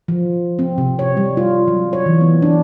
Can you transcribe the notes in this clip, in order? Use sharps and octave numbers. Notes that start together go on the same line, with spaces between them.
F3
C4
C3
C#5
G3
F4
F#3
C#5
E3
B3
D4